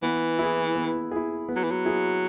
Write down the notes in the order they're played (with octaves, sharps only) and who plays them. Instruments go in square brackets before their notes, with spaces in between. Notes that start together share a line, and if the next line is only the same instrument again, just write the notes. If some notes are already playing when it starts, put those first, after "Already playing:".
[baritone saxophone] E3 [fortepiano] B3
[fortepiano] E4 G#4
B3
E4 G#4
B3
[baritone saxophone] F#3
E3
F#3
[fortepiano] E4 G#4